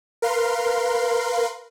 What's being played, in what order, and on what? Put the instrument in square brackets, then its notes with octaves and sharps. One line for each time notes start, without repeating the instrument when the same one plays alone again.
[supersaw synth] A#4 B4 F5 C6